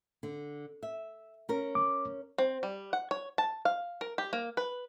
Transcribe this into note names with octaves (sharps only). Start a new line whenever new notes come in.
D3
E5
C#4 A#4
D6
C4
G3
F#5
C#5
A5
F5
A#4
G4
A#3
B4